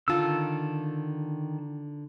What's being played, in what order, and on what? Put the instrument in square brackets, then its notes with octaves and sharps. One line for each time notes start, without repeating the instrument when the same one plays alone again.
[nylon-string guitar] D3 F4 [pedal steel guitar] D#3 A5 E6